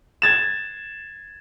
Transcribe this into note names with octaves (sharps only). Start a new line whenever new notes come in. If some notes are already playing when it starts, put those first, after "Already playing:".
G#6 A6 E7